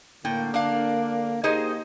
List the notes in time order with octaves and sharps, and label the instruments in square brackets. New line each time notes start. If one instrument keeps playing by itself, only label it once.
[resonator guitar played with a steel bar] A2 G5 [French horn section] D3 A#3
[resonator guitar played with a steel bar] D4 F5
[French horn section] A#3 G4 D#5 [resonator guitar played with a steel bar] D#4 G#4 C5